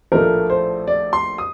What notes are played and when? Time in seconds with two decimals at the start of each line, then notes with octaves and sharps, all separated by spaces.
0.12 A#1 A2 F3 A3 A#4
0.50 C5
0.88 D5
1.13 C6
1.38 D#6